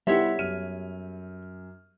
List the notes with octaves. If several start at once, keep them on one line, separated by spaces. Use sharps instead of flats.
G3 B3 E4 A4 C#5 E5 F#5 C6
F#2 F6 D#7